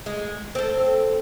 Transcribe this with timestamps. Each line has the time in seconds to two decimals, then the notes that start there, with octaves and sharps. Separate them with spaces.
0.06 G#3
0.55 C4 A4